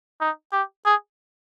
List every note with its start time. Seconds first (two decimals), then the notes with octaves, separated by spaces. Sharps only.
0.21 D#4
0.52 G4
0.85 G#4